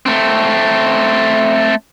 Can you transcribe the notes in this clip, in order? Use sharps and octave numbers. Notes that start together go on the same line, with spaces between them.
A3 C4